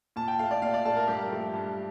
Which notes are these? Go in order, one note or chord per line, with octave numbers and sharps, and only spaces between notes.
A#2 A5
G5
A3 F5
D5
A#2 F5
D5
A3 A5
A#4
G2 G4
F3 A3
G2